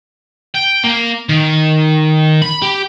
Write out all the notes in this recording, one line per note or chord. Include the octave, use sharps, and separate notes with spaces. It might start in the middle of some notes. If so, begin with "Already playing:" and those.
G5
A#3
D#3
B5
G4